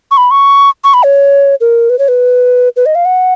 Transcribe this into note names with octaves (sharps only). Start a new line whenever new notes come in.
C#6
B5
C#6
C#6
B5
C#5
A#4
B4
C#5
B4
B4
D#5
F5
F#5